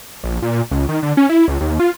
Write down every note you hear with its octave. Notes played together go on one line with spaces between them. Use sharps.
A#1
A#2
C#2
D#3
D3
C#4
E4
C#2
D#2
F4